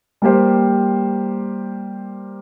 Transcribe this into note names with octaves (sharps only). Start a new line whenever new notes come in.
G3 A#3 G4 C5